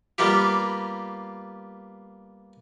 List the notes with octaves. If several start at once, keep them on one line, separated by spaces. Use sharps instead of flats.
G3 A#3 B3 F4 G4